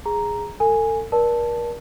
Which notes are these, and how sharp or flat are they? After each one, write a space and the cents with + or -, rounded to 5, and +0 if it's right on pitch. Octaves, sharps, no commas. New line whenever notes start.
G#4 -5 A#5 +0
A4 +35 G#5 +0
A#4 +35 D5 +0 A5 +0